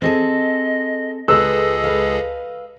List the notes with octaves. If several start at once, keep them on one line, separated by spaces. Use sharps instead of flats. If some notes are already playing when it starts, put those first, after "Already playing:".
C4 G#4 A4 D#5
C#2 G#4 A4 B4 D#5 E6
B4 F5